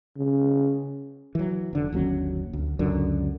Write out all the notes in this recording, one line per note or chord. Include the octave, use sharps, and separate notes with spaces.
C#3
E3 F#3
F1 D3
G1 D#2 F#3 C#4
D2
C#2 F#2 D3